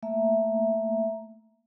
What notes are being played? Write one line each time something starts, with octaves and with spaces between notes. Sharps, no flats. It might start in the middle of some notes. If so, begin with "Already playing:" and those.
A3 A#3 E5 A#5